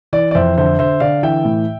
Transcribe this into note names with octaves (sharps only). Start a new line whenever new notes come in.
E3 D5
D5
F2 C5 E5
D3 C5 E5
D3 C5 E5
D3 D5 F5
E3 E5 G5
A2